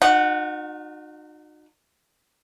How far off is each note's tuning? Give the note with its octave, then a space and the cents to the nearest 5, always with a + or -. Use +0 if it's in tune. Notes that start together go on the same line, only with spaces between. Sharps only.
D#4 -35 F#4 -45 F#5 +0